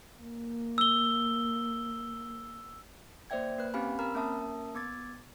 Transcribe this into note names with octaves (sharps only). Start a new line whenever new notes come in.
A#3
E6 G7
A#3 C5 D5 E5 G5 G#6
A#3 B4 F#6
C4 C#4 G4 F5 G#5 B5
C4 A#4 A#5 B5 F6
A#3 C#4 A#4 E5 A5 D#6
B3 D6 G#6 A6